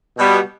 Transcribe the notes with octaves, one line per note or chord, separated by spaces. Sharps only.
B2 G3 B3